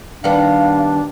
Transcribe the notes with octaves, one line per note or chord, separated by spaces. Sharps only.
D#3 G3 B3 D4 F5